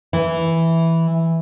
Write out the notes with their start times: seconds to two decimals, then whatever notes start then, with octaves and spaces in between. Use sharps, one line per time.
0.13 E3